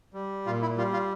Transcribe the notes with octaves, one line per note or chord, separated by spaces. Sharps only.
G3
A#2 F4
E4
G3 F4
F4